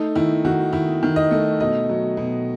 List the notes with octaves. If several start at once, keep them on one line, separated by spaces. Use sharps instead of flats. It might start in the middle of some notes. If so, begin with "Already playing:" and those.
Already playing: A3 D#4
D#3 E4
D#3 F#4
D#3 E4
D#3
D#5
A3
B2 D#5
F#3
B2